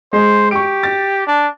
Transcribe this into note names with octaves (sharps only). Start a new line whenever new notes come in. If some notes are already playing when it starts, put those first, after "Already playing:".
G#3 C5
G4 C#6 D7
A6
D4